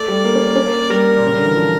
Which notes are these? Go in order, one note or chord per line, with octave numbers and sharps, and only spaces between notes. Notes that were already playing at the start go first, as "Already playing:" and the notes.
Already playing: A3 D5
G3
A#3
C#4
A#3
C#4
A#3
G3 A#4
A#2
C#3
D3
E3
F3